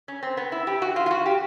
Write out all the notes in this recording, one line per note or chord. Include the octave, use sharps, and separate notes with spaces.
C#4
C4
B3
E4
G4
F#4
F4
F4
F#4
G4